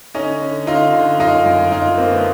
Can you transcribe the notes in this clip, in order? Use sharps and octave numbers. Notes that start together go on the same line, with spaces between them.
D3 C#4 D#4
D3
D3 D#4 F4
D3
F#2 D#4 F4
F#2
F#2 D#4 F4
D3 A#3 C4
A3 B3